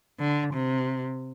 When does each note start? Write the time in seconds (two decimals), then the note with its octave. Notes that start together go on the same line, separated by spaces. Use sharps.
0.20 D3
0.54 C3